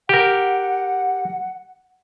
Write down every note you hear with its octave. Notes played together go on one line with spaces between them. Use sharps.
G4 A#4 F#5